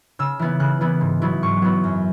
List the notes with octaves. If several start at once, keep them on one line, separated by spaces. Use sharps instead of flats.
C#3 E6
E3 B3 E4
C#3 F#6
E3 B3 E4
G#2
F#3 B3 E4
G#2 C#6
F#3 B3 E4
F#2